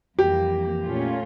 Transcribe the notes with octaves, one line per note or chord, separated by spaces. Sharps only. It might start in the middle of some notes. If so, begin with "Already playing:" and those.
F2 E3 G3 A#3 G4
A#2 A3 C#4 F4